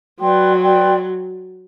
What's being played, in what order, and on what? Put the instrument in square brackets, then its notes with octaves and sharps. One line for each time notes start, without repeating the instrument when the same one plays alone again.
[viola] F#3 [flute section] B4 D5 G5 C6
[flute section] B4 D5 G5 C6